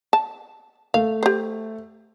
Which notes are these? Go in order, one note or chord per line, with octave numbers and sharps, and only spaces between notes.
A5
A3 F5
G4 C5